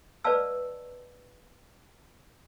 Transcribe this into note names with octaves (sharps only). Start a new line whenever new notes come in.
B4 D5 D#5 F5 A5 E6